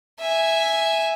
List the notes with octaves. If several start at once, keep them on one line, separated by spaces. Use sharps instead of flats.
E5 G#5